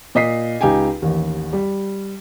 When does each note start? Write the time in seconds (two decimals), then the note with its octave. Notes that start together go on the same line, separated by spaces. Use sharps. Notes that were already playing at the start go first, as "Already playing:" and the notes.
0.15 A#2 D#5 D#6 B6 C7
0.61 C#2 D#4 G4 G5 G#5
1.02 A1 D#2
1.53 G3